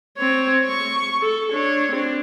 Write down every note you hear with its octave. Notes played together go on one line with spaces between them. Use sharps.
C4 C#5
C#6
A4
D4 C#5
C4 D4